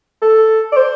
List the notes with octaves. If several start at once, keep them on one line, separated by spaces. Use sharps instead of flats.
A4
D5
C5